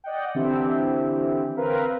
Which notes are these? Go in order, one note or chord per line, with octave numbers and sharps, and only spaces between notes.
D5 D#5 F#5 G5
D3 E3 C4 E4 G4
C4 A#4 B4 F5